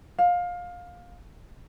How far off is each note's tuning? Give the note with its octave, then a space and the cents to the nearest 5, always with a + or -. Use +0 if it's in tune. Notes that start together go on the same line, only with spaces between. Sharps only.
F5 +20